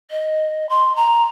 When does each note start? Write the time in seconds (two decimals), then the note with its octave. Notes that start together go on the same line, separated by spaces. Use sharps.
0.11 D#5
0.69 C6
0.96 A#5